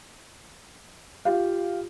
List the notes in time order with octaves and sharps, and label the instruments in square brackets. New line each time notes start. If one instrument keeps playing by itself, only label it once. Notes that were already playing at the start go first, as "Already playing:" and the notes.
[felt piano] F4 G4 F5